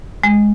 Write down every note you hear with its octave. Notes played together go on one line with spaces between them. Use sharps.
G#3